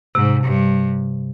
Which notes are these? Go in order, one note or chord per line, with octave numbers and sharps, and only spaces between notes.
G#2 C3
G2